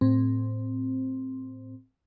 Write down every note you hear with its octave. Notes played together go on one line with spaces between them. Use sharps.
A2 C4